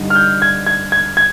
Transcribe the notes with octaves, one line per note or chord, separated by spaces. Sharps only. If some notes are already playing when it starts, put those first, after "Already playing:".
Already playing: G2 D3 G3 D#4
F6
G6
G#6
G#6
G#6
G#6